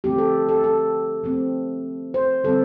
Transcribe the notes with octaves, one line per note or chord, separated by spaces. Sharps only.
D3 F3 A3 C4 G4
A4
A4
A4
F3 A3 C4
C5
D3 G3 C4 A4